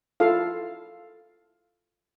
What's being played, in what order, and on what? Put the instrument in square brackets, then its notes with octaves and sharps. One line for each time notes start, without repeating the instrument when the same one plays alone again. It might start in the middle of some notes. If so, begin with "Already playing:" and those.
[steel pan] E4 F4 A4 F5